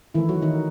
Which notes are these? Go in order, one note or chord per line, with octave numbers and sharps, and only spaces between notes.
D#3 E3 A3 E4
F#3 F#4
D#3 D#4